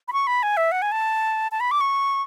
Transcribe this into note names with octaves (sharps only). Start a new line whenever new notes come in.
B5
C#6
B5
G#5
E5
F#5
G#5
A5
A5
B5
D6
C#6